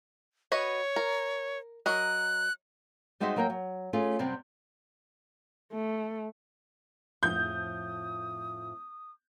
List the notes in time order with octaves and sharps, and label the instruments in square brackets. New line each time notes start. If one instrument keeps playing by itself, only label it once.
[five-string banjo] F#4 B4 D#5 [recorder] C#5
[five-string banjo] A#4
[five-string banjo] F#3 A#4 D#5 [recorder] F#6
[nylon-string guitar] G3 G#3 D#4 F#4 C5 E5
F#3 A#3 A#4 F5 G5
F#3
A3 C#4 F4 G#4
F#2 C3 G3 C4
[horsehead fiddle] A3
[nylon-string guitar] F2 A2 F3 [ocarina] D#6 [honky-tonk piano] G6